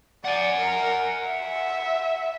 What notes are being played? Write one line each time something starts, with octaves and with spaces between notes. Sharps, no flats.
D5 F#5 G#5
A#4
E5